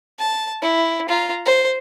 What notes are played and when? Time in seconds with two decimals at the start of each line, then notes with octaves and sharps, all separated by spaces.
0.19 A5
0.62 E4
1.09 F4 A#5
1.46 C5